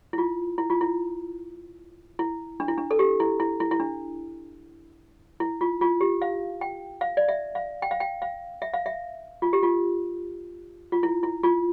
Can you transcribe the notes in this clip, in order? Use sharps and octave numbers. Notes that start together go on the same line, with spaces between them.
E4
F4
E4
F4
E4
E4
D4
E4
D4
A4
G4
E4
E4
E4
E4
D4
E4
F4
F4
G4
F5
G5
F5
D5
E5
F5
G5
F5
G5
F5
E5
F5
E5
F4
G4
F4
F4
E4
E4
F4